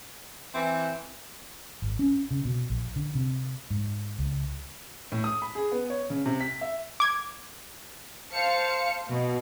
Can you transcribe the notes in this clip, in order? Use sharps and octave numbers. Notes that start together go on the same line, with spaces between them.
E3 C4
G#1
C#4
C#3
B2
A#1
D3
C3
G#2
C#2
A2
D#6
B5
G#4
B3
C#5
C#3
C3
B6
E5
D6 G#6
C5 F5 A5 C#7
B2